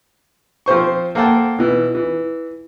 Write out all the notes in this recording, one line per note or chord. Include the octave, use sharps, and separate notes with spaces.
F3 C4 C5 C#6
A#3 A4 C5 F#5 G5 A5
B2 E3
E3